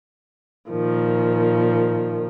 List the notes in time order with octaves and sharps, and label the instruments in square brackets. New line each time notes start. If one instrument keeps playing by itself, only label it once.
[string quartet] A#2 D#3 F3